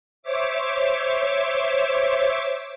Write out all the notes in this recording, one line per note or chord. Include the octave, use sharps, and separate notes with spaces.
C5 C#5 E5 D6